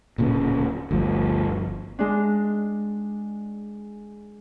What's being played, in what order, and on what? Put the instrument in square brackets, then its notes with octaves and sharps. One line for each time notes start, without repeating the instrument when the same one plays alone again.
[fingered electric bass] D1 A#2 C#3
[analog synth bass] G1 [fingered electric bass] D2 F3
[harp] G#3 D4